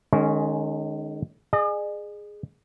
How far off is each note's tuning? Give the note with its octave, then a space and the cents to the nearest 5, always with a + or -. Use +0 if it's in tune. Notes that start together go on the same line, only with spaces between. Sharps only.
D#3 -30 G#3 +15 C#4 +0
G#4 +0 D#5 -45